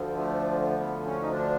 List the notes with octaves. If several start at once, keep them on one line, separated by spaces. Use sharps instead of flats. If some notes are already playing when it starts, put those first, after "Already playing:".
Already playing: D2 D3 F3
A3
B3
C#4
D#4
D4